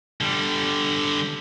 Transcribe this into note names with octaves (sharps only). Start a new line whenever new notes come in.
D3 G3